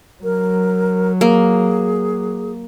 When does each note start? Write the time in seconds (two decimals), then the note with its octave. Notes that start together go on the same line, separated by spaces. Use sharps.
0.24 F#3 A#4
1.21 A#3 G#4